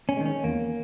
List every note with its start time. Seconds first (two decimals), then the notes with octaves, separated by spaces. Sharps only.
0.09 C#4
0.17 D#3 G#3
0.26 C#4
0.44 E2 A#3